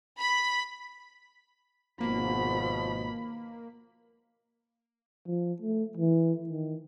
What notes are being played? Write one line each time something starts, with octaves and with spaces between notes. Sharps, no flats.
B5
G#1 B2 F3 A#3 B5
F3
A3
E3
D#3